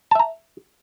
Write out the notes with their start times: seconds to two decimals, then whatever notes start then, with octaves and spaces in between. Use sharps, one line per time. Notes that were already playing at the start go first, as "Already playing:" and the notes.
0.11 A5
0.15 E5
0.19 A#5